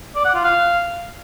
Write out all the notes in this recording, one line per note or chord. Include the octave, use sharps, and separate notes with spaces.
D5
F#5
F4
F5